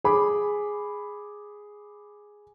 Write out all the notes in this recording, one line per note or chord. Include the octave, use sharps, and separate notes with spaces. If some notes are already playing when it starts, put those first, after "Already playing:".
G#4 B5 D6